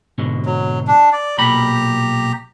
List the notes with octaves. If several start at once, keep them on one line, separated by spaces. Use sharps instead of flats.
G#2 B2 D3
F#3
D4
D5
B1 A#2 G4 A#5 B5